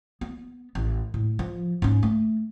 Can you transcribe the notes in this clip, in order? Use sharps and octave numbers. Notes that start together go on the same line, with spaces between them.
B3
A1
A2
F3
G#2 C#4
A3